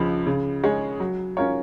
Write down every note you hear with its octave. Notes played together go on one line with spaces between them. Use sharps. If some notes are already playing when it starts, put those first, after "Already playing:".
Already playing: C#2 C#3 F3
C#3
G#3 C#4 G#4 C#5
F#3
C#4 F4 A#4 C#5